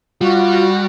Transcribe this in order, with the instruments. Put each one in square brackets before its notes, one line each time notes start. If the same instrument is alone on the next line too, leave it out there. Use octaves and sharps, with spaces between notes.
[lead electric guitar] G3 [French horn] F4 [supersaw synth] F#4